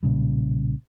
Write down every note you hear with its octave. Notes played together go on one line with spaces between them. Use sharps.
B1 A#2 C#3 G3